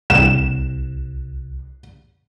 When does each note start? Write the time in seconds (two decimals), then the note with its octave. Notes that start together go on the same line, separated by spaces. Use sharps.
0.10 C2 E7